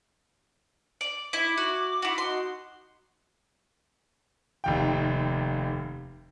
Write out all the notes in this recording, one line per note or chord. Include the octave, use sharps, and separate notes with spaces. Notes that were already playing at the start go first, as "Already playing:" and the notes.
D5
E4 D6
F#4
E4 F#4
D#4 F#4 C6
F1 D#2 G5